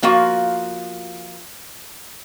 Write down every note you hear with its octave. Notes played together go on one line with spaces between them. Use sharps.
F3 A#3 F4 F#4 F5